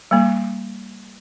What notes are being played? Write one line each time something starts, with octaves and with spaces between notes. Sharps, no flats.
G3 A#3